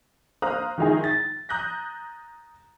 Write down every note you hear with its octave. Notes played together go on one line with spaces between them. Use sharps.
C5 F5 A#5 D#6 F6 F#6
D#3 F3 G#3 D#4 E4 G#4
A6
A#5 D#6 F#6 G6 A#6